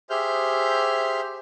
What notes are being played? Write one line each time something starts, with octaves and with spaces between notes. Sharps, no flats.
G4 G#4 C5 E5 F6 G6